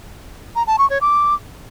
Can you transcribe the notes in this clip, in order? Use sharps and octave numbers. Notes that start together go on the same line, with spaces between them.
A#5
A5
C#6
C#5
D6